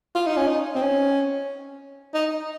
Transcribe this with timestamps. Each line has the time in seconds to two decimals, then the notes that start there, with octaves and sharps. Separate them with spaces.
0.15 F4
0.26 D#4
0.37 C#4
0.47 D#4
0.75 C4
0.81 C#4
2.14 D#4